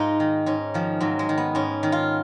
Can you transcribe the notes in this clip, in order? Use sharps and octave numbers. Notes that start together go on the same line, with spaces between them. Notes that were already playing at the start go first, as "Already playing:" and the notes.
Already playing: G#2 D#4 F4
D#3
G#2 C#4
D#3 F3
G#2 F#3
G#3
D#3
B3
G#2 C#4
D#3
F4